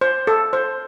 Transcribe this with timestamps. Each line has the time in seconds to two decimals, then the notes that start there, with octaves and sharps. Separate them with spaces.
0.01 C5
0.27 A4
0.53 C5